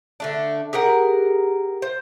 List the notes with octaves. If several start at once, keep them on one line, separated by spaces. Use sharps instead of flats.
D3 A3 D4
G4 G#4 A#4 F#5
C5